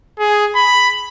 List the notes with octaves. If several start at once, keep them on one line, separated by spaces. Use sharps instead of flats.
G#4
B5